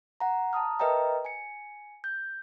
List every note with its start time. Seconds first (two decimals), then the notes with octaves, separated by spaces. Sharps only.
0.20 F#5 A#5
0.53 A5 A#5 D#6 F6
0.79 A#4 B4 D#5 E5 G5 A#5
1.25 G#5 C#7
2.04 G6